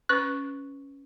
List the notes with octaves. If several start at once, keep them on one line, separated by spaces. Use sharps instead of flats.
C#4 B4 C#6 F#6